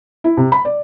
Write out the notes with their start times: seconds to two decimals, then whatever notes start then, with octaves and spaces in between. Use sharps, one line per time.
0.24 E4
0.37 C3
0.52 B5
0.65 D5